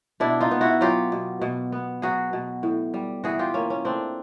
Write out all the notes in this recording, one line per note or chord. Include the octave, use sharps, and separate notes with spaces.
B2 D4 E4
D#4 F4
B3
E4 F#4
F#3 F4 G4
B2
B2
B3
F#3 F#4 G#4
B2
A2
G3
E3 F#4 G#4
F4 G4
A#3 C#4
C#4
A2 C4 D4